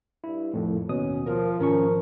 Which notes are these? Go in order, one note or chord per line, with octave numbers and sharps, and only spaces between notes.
G2 E4
F2 A2 D#3
D#2 B2 C#4 D#6
F3 A#4
G#1 F3 C#4 A#4 C#6